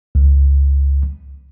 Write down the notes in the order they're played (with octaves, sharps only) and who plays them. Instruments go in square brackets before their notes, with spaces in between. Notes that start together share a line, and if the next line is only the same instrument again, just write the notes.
[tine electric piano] C#2